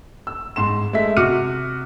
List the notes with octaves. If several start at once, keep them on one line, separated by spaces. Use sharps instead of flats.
E6
G#2 C6 E7
G#3 A3 E5 B6
C3 F#4 D6 F6 C#7 D#7